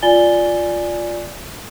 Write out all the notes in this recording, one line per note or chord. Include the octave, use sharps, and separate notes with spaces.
F4 D5 G#5 A6 G7